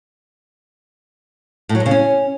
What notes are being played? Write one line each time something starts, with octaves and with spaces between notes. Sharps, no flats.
A2
F#3
G2
C#3
C#4